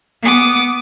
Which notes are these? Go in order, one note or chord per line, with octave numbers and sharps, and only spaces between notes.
B3 D6 D#6